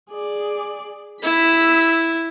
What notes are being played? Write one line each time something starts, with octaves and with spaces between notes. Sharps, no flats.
G#4 D5
E4 E6 B6